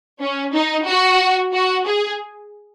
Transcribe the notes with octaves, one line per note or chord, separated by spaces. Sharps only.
C#4
D#4
F#4
F#4
G#4